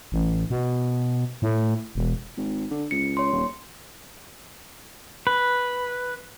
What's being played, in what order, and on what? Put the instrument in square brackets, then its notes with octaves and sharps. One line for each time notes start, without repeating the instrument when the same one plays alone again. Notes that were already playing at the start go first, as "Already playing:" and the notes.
[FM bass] A1
B2
A2
E1
[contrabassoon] G#1
D3
[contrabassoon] C#2 [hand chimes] C#7
[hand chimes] C#5 C6
[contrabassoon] D#1
[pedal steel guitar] B4